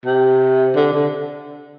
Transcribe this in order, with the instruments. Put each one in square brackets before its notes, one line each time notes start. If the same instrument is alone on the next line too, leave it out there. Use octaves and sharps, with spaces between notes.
[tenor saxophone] C3
D3
D3